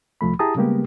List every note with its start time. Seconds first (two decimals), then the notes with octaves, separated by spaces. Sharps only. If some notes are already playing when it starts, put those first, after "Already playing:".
0.21 C2 F3 A3 B5
0.39 E4 G4 G#4 A5 A#5 D#6
0.56 C#3 G3 G#3 A#3 B3 G4